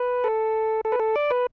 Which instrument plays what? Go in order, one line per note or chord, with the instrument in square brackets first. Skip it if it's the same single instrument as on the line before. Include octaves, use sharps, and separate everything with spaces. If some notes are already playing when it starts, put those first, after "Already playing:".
Already playing: [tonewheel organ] B4
A4
A4
B4
A4
D5
B4